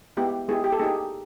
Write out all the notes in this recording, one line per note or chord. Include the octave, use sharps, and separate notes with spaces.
G#3 B3 E4 G4
G#3 B3 E4 G4 G#4
G4
A4
A#3 D#4 G4 G#4